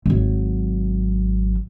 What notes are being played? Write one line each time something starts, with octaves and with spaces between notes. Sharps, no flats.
G#1 F#3